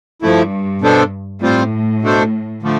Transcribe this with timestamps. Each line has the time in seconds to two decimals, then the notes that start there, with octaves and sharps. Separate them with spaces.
0.22 G2 F3 A3 E4
0.81 B2 B3 D4 A4 C5
1.41 A2 G3 C4 F4 C5
2.02 B2 A3 D4 A4 C5
2.62 D3 F3 A3